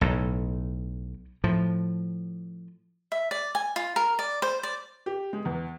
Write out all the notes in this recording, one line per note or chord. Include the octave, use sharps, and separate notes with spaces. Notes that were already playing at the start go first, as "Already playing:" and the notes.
B1 A2
A2 F3
E5
D5
G#5
F4
A#4
D5
C5
D5
G4
G#3
E2